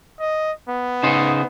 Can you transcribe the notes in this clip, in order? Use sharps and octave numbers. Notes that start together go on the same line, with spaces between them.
D#5
B3
C#3 D#4 C5